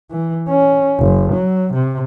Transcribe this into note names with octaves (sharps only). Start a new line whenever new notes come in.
E3
C#4
F#1
F#3
C3